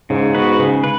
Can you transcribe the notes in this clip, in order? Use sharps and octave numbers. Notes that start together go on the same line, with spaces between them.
G#2 C#3
B3 F#4 B4
C#3
B4